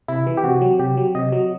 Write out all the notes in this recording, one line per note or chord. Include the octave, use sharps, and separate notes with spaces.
C3 E4
E3
G4
C3 F#4
F#3
C3 G4
F#3
C3 D#5
F#3